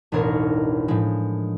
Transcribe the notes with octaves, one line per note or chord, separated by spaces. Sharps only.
E1 A1 D4 D#4 A#4 C#5
A2 F3 G#3